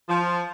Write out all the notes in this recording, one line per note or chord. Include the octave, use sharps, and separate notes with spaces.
F3